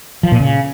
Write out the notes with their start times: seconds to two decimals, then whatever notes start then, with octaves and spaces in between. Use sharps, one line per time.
0.23 F3
0.32 A#2
0.40 C#3